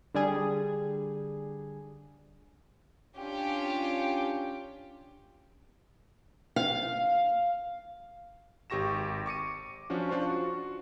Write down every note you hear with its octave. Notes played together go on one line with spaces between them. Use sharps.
D3 G3 G#4
C#4 D4 F4 G4
F5
G#1 G4 C#6 A#6 E7
C#6 D6 C#7 D#7
F3 C#4 D4 F#4
D4 F4 C5 C#6
F#4 C#6